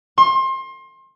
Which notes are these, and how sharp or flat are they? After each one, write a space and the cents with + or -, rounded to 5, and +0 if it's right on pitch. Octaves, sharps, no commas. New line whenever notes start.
C6 +30